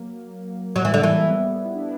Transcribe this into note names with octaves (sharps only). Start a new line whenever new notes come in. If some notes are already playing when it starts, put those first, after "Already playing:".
Already playing: F#3 A#3
F#3 G3
E3
D3
E3 F#3 A#3
G3 B3
E4
D4